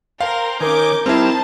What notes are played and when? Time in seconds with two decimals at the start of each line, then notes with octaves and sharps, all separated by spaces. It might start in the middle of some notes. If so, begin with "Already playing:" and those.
0.20 A#4 C5 F5 G5
0.60 D#3 C#4 A#4 G#5 D6 G6
1.06 G3 C4 D#4 E4 C5 A5 F6